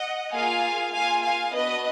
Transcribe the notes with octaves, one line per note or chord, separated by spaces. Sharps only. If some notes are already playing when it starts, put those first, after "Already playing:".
Already playing: D#5 F#5
A#3 F4 G#4 F5 G#5
A#3 F4 G#4 F5 G#5
F5 G#5
B3 D4 F#4 B4 D#5